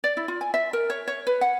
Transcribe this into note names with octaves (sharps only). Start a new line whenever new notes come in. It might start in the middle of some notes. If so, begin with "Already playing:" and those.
D5
E4
F4
G#5
E5
A#4
C#5
C#5
B4
F#5